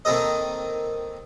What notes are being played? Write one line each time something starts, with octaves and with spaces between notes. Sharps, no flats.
D#3 A#3 C4 D#4 A4 D#5